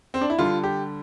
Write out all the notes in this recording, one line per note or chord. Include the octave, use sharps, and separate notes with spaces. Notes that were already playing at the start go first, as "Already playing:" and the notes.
C4
D4
E4
D3 G3 F4
G4